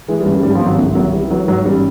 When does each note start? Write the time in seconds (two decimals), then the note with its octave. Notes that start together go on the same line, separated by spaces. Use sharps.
0.08 E3 G#3
0.21 G3
0.25 A1
0.32 G3
0.43 G#2 G3
0.55 F3
0.61 G#1
0.66 F#3
0.78 C2
0.95 C2 F#3
1.13 E3 G3
1.30 E3 F#3
1.48 G#2 F#3
1.65 A1 G3